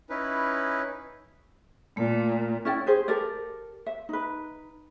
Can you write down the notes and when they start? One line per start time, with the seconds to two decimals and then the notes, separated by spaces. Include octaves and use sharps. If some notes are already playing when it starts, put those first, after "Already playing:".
0.10 C#4 D#4 E4 B4
1.97 A#2 A3
2.65 C#4 E4 D5 G5
2.86 G4 G#4 C5
3.08 G4 A4 A#4 D5
3.86 E5
4.09 D#4 B4